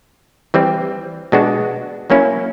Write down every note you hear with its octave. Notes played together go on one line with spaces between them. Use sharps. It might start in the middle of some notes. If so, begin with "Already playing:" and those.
E3 G3 C4
B2 G#3 B3 D4 F#4
F#3 A#3 C#4 E4